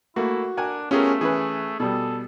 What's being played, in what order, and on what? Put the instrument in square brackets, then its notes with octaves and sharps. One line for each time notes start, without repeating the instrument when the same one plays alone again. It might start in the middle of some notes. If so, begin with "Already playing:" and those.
[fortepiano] A3 A#3 [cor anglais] E4 [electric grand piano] F#4
[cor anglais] D4 [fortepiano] A#4 F#5 G#5
[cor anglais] A3 [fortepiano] B3 F4 G4 [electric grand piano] C#4 G#4 A#4
[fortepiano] E3 C#4 B4 [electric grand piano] G#4
[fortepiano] B2 G3 [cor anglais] A4